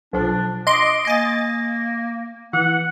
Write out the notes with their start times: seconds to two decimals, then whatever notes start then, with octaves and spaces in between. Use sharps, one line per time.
0.13 B1 F3 D4
0.67 D#5 C6 D6
1.05 A#3 D#5 G#5 A6
2.53 E3 F#5